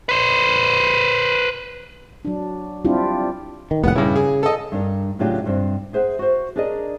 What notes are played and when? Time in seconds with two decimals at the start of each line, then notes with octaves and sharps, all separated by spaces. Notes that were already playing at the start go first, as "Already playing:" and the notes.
0.09 B4 C5
2.25 F#3 D4
2.85 G3 C4 D4 E4 F4 G4
3.71 D#3
3.84 F1 D#2 A2 B3 F#5
3.96 G2 C#3 E4
4.16 G#4
4.43 A4 D#5
4.72 G2 D4 A#4
5.19 A2 C#3 F#3 D4 F4 G4
5.46 G2 C3 C4 D4
5.93 G#4 C5 E5 F#5
6.19 F#4 C5
6.56 D4 G#4 A#4 D5 D#5